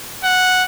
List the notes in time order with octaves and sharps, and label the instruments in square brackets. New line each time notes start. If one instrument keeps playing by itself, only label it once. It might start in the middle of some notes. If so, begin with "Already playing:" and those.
[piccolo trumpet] F#5